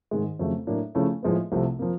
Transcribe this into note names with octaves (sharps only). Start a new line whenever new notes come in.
G#2 D#3 G#3
F2 C#3 F#3 A3
A2 F#3 A#3 D4
C#3 F3 A3 C#4 E4
A2 F3 G#3 B3
C2 C3 F3 A3
F3 A#3